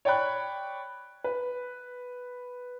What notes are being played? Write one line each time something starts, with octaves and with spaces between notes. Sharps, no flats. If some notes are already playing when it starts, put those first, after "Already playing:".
C#5 D5 G5 B5 F#6
B4